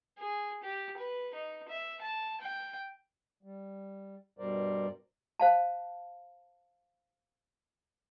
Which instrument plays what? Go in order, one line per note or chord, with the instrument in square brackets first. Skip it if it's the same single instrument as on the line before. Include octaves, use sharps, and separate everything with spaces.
[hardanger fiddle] G#4
G4
B4
D#4
E5
A5
G5
[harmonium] G3
G2 B2 G3 A#4 C5 D5
[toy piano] C5 F5 A5